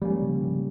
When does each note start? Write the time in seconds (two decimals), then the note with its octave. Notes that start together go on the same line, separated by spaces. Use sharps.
0.02 F3 G3 G#3 A#3 C#4
0.22 C#3 F3
0.42 C#3 F3